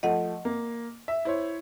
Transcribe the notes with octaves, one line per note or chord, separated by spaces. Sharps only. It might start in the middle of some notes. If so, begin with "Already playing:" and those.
F3 A3 D#5 F#5
A#3
E5
E4 C5 C#5